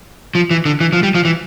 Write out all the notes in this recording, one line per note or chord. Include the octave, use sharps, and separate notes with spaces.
F3
E3
D3
E3
F3
G3
F3
E3